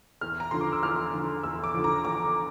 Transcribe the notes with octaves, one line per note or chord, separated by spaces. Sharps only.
E2 F6
A#5
D3 F3 C6
D6
E6
E2 F6
D3 F3
E2 E6
D6
D3 F3
A#5
E2 D6